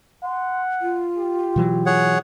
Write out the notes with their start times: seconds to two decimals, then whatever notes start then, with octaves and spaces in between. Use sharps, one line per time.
0.24 F#5 C6
0.81 F4
1.18 G4
1.56 B2 E3 F#3
1.86 G#4 C#5 F#5